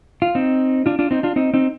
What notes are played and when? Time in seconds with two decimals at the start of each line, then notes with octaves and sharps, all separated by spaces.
0.22 F4
0.35 C4 D#4
0.86 D4 F4
0.99 D4 F4
1.11 C4 D#4
1.23 D4 F4
1.36 C4 D#4
1.54 C4 D#4